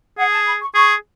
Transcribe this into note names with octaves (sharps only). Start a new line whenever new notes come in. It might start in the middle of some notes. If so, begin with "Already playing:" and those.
G#4 F#5
A5
B5
C#6
G#4 C#6